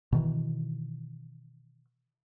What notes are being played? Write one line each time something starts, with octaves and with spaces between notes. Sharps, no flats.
B2 D#3 E3